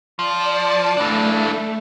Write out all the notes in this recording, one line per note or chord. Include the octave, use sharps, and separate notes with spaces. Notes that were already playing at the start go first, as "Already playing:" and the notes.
F3 D5 A5
E3 A3 D4